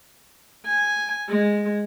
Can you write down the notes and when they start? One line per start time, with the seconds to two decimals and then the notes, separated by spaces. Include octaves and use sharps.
0.66 G#5
1.29 G#3